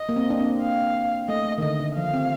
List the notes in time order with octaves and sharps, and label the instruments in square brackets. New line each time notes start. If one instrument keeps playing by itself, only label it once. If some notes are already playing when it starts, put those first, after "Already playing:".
Already playing: [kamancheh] D#5
[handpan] A#3
C4
D4
C4
[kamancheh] F5
[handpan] A3 [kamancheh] D#5
[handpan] A3
D#3
[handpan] D3 [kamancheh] D#5
[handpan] D3
[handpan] F3 [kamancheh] F5
[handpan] C4